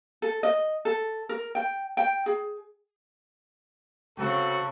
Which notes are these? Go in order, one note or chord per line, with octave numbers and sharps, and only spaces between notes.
A4
D#5
A4
A#4
G5
G5
G#4
C#3 C4 F#4 A4